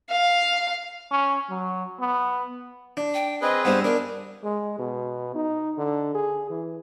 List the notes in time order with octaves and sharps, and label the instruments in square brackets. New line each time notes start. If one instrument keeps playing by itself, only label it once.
[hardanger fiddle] F5
[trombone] C#4
F#3
B3
[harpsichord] D4
[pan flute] G5
[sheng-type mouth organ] C4 G#4 B4 [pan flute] D#5
[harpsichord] G2 B3 [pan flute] C5
[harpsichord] D4 [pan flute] A#4
[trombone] G#3
B2
D#4
D3
G#4
E3